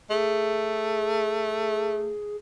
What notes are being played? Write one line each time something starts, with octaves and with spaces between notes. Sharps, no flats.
A3 G#4